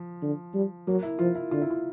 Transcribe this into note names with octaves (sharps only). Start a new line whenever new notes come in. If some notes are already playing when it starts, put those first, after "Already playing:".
Already playing: F3
D3
G3
F#3 A#3
E4
F3 F4
E4
D3 F4
E4
F4